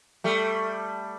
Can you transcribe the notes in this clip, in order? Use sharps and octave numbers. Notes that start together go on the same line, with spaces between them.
G3 A3